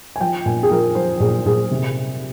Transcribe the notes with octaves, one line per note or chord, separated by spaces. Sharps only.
G#5
F3 G5
A#2 G#5
G#4
F3 A#4
F3 C5
A#2 G#4
A#2 G#4
C3